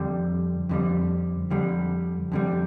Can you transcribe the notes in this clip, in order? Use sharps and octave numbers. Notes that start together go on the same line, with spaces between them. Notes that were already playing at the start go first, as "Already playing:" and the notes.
Already playing: F2 D3 G3
F2 D3 G3
F2 D3 G3
F2 D3 G3